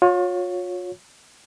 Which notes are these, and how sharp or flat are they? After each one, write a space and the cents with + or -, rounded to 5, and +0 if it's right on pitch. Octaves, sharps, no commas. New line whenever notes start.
F4 +40 C#5 +0